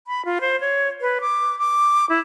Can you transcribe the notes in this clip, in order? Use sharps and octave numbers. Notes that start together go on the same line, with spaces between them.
B5
F4
C5
C#5
B4
D6
D6
E4